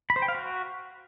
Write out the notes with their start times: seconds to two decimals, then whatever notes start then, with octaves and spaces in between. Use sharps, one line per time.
0.10 B5
0.16 C5
0.22 G5
0.28 F5
0.35 F#4